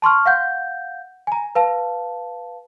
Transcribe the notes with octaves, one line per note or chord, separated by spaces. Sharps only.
A5 C6 C#6 F6
F5 F#5 G6
G#5 A#5
B4 F5 A5